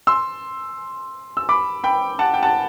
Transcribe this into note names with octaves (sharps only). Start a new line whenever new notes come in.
C6 E6
E6
B5 D6
G5 B5
F#5 A5
G5
F#5 A5